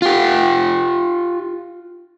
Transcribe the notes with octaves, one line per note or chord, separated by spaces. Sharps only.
F4 G4